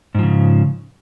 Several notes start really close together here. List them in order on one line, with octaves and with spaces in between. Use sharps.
G#2 F3 C#3